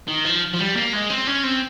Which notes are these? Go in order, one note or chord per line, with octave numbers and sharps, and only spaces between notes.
D#3
F3
F3
G3
A#3
G#3
C4
C#4
C4